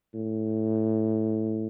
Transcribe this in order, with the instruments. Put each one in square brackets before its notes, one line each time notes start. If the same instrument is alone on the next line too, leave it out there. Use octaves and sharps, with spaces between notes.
[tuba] A2